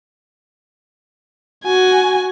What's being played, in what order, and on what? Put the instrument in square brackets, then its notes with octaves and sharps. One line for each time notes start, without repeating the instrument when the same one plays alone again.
[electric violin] F#4 G#5